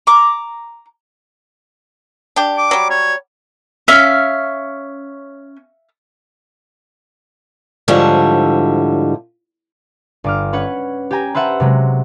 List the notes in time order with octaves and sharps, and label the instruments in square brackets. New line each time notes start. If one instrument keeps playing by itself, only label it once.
[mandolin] A#5 D6
[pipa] D4 G4
[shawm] D6
[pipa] F#3 G3
[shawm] C#5
[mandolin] C#4 [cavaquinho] E5 F5
[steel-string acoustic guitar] G#2 D3 F3 G3 E4 C#5
[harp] G1 D6 F6
C#4 B4 C#5 F#5
G4 G5 G#5 A#5
B4 C5 E5 F#5 A5
C3 F#3 G#3